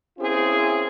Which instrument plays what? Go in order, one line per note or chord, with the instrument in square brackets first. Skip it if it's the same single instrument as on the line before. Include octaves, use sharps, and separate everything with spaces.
[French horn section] A#3 C4 C#4 E4 G#4